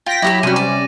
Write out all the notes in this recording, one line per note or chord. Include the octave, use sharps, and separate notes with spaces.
F4 G5 A#6 B6
F#3 E4 G4 B5 D6 A#6
C3 G3 C#4 F#4 G#4 D#7
D5 D#7